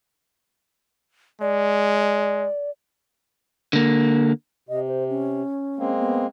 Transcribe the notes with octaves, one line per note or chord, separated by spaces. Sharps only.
G#3 D5
D3 A#3
C3 D#5
C5
C#4
G#3 A#3 C4
B3